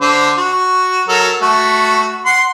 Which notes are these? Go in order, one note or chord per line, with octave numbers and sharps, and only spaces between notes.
D3 C5
F#4
F#3 A4 A#4
A3 F#4
F#5 C6